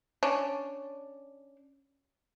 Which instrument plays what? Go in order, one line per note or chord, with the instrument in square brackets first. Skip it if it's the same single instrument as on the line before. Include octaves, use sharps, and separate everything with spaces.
[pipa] C#4 D4